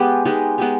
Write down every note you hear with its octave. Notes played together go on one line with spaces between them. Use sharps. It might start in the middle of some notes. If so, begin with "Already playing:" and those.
Already playing: G#3 B3 G4
G#3 B3 D#4 G4
G#3 B3 D#4 G4